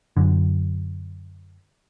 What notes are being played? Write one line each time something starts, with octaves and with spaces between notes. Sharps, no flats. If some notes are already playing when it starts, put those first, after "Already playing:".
F#2 D3